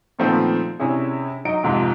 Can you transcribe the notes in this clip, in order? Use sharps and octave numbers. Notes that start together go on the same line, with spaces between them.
A#2 D#3 F3 A3 B3 C4
C3 C#4 D4 E4 G#4
F#3 D#4 D#5 D7
F2 G#2 C3 F3